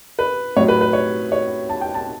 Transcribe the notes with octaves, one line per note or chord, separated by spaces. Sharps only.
B4
A2 F#3 C#5
B4
B4
C#5
C#5
A5
G5
A5